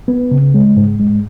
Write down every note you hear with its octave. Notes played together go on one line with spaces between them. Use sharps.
B3
C#3
G#3
G#2
G#3